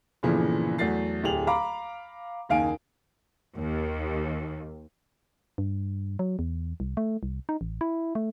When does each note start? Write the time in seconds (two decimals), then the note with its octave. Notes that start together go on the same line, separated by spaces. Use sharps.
0.23 G1 A#2 C#3 E3 F3
0.78 E2 F#3 A3 A6 C7
1.24 D1 G4 G#4 F7 F#7
1.47 F5 A#5 B5 D6
2.49 F#1 D#2 D#4 F5 G#5 D7
3.56 D#2
5.58 G2
6.19 F#3
6.39 E2
6.80 C2
6.97 A3
7.23 C2
7.49 D#4
7.61 A1
7.81 E4
8.15 A3